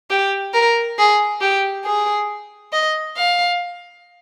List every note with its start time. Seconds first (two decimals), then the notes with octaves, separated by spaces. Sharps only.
0.10 G4
0.54 A#4
0.98 G#4
1.41 G4
1.85 G#4
2.73 D#5
3.17 F5